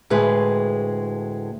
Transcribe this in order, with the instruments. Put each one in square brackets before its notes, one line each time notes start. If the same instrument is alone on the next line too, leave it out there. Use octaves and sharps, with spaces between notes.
[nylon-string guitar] D2 A2 G#3 B4